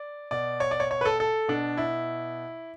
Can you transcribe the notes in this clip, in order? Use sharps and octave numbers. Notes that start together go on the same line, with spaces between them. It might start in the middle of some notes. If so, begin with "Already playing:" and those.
Already playing: D5
B2 D5
C#5
D5
C#5
C#5
B4
A4
A4
B2 D4
E4